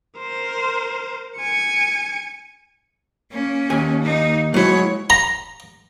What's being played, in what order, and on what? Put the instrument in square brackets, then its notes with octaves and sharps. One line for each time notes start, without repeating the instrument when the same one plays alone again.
[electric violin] A#4 C5
G#5 C#7
[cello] A#3 C#4
[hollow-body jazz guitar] D#2 G#5
[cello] A#3 D#4
[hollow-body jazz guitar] F#3 E4 [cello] G#3 C#5
[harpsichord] A#5